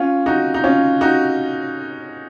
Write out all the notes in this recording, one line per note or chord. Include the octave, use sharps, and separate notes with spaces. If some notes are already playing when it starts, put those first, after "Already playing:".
Already playing: C#4 F4
D#4 F#4
D#4
C#4 F4
D#4 F#4